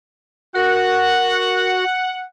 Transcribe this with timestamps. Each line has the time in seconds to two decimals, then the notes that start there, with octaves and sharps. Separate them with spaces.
0.55 F#4 A#4 F#5